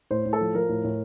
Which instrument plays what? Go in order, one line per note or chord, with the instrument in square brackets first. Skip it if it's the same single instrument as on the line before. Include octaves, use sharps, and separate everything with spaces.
[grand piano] A2 C5
A2
A4
F3
F3 A#4
A2
A2